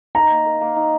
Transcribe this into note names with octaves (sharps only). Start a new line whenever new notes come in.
D#4 A#5
A#3
A#4
A#3
D#4